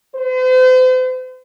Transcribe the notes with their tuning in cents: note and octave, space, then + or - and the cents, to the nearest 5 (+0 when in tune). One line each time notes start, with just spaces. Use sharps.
C5 -40